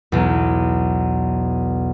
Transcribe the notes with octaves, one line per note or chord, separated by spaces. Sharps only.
B1 E2